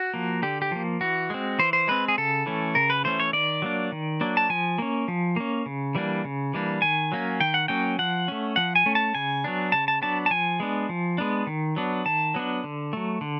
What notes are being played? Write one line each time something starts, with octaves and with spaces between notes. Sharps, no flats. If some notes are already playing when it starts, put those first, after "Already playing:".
Already playing: F#4
F3 A#3
D3 G4
G4
F3 A#3
E3 F#4
G#3 C4
E3 C5
C5
G#3 C4 B4
G#4
C#3 A4
E3 A3 C#4
C#3 A#4
B4
E3 A3 C#4 C5
C#5
D#3 D5
F#3 A#3 D4
D#3
F#3 A#3 D4
A5
F3 G#5
A#3 C#4
F3
A#3 C#4
C#3
E3 G3 A#3 D4
C#3
E3 G3 A#3 D4
D#3 G#5
F#3 A#3 C#4
D#3 G5
F#5
F#3 A#3 C#4 G5
F3 F#5
A3 C#4
F3 F#5
G#5
A3 C#4
A5
C#3 G#5
F#3 B3 D4
C#3 A5
A5
F#3 B3 D4 A5
A5
F3 G#5
G#3 B3 D4
F3
G#3 B3 D4
D#3
F#3 B3 D4
D#3 A5
F#3 B3 D4
D3
F#3 A3
D3